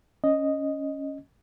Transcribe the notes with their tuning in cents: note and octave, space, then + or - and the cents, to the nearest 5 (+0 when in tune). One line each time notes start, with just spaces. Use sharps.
C#4 +0 D#5 +0